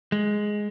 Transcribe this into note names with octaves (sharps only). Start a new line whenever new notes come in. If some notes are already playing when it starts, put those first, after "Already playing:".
G#3